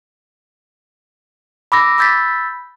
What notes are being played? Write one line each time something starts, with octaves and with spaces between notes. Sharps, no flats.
B5 D6 E6 A#6
B5 E6 G6 A6 B6